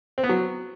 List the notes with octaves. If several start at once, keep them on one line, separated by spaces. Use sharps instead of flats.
C4
B3
F#3